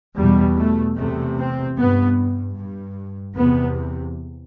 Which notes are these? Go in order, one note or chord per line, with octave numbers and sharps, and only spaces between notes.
E2 B2 G3
A3
E2 C3 A3
C4
G2 B3
G2
E2 C3 B3